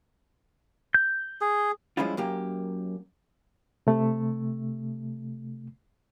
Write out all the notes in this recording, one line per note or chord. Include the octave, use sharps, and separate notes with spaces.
G6
G#4
G2 F3 G#3 C#4 E4 F4
F#2 A#3 G4
C3 A3